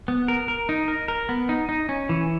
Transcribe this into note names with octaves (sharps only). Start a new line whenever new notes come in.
B3
A#4
A#4
D#4
A#4
A#4
B3
D#4
D#4
C#4
E3